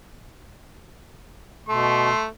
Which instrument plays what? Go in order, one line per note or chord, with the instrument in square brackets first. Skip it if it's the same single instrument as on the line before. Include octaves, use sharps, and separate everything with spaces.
[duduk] B2 [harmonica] A3 [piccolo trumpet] C6